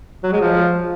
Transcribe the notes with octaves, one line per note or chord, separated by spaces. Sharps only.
F#3
G#3
F3